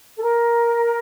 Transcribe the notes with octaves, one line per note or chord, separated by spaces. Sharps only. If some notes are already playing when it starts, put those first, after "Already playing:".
A4
A#4